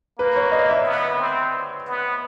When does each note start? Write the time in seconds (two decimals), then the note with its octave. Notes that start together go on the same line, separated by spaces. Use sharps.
0.18 A#3 B4
0.36 C#5
0.52 D#5
0.70 E5
0.85 B3
1.19 C4
1.87 B3